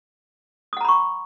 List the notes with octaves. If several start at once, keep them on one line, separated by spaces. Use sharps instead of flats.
F#5 A#5 B5 C#6 D#6